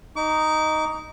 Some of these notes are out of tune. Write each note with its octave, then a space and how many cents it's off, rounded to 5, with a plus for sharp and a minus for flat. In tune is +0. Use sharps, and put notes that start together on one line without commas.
D#4 +0 D6 -35